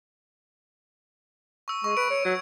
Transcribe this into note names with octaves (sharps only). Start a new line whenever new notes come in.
C#6 E6
G#3 C#6
B4 D7
C#5
F#3 G#6